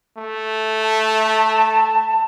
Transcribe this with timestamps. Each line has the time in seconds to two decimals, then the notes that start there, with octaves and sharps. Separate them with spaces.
0.17 A3
0.79 A5